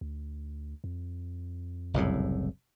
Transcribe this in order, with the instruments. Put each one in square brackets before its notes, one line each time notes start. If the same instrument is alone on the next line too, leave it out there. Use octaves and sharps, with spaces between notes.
[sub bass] D2
F2
[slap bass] F#1 C2 A2